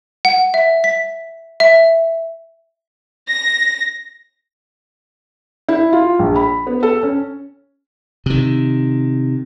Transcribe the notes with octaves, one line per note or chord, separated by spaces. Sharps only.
F#5
E5
B6
E5
A#6
E4
F4
A#1
B5
B3
A4
C#4
C3 D#3